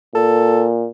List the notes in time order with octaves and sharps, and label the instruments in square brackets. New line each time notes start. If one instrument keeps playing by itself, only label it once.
[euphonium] A#2 [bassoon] A4